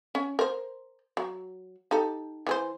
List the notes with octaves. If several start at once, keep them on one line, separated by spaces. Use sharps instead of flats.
C#4
A#4 C5
F#3
D#4 G4 A4
E3 G#4 C5